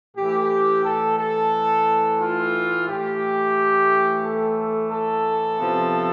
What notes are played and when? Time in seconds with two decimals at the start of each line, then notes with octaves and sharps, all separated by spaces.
0.17 A2 E3 A3 G4
0.85 A4
1.19 A4
2.20 F4
2.88 A2 E3 A3 G4
4.24 A4
4.92 A4
5.59 C3 F3 B3